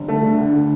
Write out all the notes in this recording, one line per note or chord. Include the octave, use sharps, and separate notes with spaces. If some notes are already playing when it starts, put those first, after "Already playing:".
Already playing: G1
D3 A3
D3
D2
D3